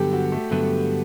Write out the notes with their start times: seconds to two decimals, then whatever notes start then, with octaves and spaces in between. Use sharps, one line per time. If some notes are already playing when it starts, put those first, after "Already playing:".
Already playing: G2 D3 F#3 B3 G4 A4
0.13 F#4
0.32 A3
0.51 G2 D3 F#3 A3 B3